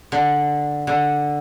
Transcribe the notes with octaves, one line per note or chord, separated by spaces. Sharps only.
D3
D3